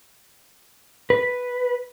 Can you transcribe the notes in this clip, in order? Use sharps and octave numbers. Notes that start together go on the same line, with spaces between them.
B4